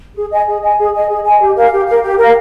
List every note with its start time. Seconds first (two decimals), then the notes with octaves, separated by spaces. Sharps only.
0.16 G#4
0.32 D#5 G#5
0.47 G#4
0.62 D#5 G#5
0.79 G#4
0.94 D#5 G#5
1.09 G#4
1.25 D#5 G#5
1.41 G4
1.56 A#4 F5
1.72 G4
1.87 A#4 F5
2.03 G4
2.19 A#4 F5